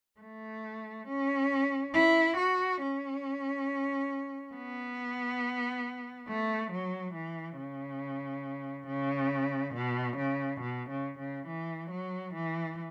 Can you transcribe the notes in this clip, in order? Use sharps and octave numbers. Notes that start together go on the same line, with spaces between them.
A3
C#4
E4
F#4
C#4
B3
A3
F#3
E3
C#3
C#3
B2
C#3
B2
C#3
C#3
E3
F#3
E3